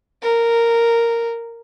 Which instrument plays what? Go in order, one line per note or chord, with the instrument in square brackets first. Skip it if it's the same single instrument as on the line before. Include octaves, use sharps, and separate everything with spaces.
[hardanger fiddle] A#4